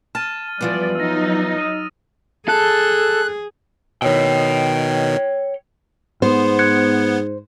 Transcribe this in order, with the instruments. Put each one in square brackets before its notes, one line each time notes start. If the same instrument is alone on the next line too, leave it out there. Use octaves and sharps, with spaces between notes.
[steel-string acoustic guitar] A5 [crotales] F6 A6 D#7
[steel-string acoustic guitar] E3 F3 B3 [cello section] G3 D5
[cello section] F#3 D#4 [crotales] E6 A#6
[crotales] D#6 D#7
[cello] G#4 [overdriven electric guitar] A4 [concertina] F#6
[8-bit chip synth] B2 D#3 [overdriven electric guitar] C#5 G5
[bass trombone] G#2 [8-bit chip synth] B3 [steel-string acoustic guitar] C5
[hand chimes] F#6 G#6 C#7